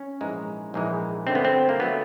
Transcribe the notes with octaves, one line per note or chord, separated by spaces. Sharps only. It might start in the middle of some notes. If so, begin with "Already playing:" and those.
Already playing: C#4
A#1 G#2 E3 G#3
A#1 G#2 E3 G#3
G2 D3 F#3 A3 C4
B3
C4
A#3
D3 F#3 A3 B3